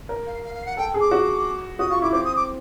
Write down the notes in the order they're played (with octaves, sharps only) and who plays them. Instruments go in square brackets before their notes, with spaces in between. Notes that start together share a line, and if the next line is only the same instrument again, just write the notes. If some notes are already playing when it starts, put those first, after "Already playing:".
[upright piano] A#4
[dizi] F5
F5
F5
F#5
[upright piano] A4 [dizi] G5
[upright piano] G#4
[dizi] D6
[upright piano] F#4
[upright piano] F#4 [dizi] D#6
[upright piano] F4 [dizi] C#6
[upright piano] E4 [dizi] D6
[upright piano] C4 [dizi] D6
[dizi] D#6
D6